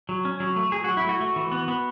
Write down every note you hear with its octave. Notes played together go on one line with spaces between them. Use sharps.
F#3
C#4
F#3
A3
F#3 G#4
F#3 F#4
E4
A3 F#4
A3
E3
B3
B3